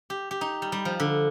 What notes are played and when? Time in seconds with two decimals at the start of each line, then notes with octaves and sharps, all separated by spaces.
0.10 G4
0.31 G4
0.41 D#4
0.62 G3
0.72 G3
0.85 F3
1.00 D3